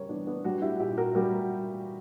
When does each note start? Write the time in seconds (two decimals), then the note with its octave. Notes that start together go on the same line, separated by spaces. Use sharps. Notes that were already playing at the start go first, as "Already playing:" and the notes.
Already playing: C#3 G3 A#4 C#5
0.09 E3 B3 D4
0.27 B3 D4
0.44 G3 D4 F#4
0.62 E4 G4
0.80 A#2 E4 G4
0.97 F#4 A#4
1.15 G3 F#4 A#4